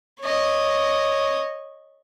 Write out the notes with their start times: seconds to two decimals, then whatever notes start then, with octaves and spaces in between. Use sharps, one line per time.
0.21 C#5 D#5